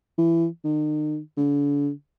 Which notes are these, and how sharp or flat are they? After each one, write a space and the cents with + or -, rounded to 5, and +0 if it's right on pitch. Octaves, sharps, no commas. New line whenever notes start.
E3 +20
D#3 -40
D3 -40